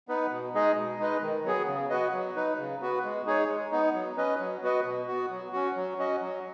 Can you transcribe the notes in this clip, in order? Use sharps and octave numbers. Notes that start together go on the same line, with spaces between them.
B3 D#4 B4
B2
G#3 D#4 G#4 D#5
B2
G#3 D#4 B4 D#5
D#3
F#3 B3 G#4
C#3
B3 F#4 B4 D#5
F#3
D#4 B4
C#3
B3 F#4 B4
G#3
D#4 G#4 C#5
G#3
B3 D#4
F#3
C#4 B4 D#5
F#3
B3 F#4 B4 D#5
B2
B3 F#4
F#3
C#4 F#4
F#3
C#4 F#4 D#5
F#3